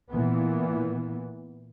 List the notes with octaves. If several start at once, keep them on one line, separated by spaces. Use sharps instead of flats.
A#2 E3 B3